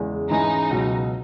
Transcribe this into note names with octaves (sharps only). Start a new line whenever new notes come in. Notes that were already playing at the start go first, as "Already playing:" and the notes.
Already playing: E2 C#3 G#3
G#2 E3 G#3 C#4 D#4
C#2 B2 F#3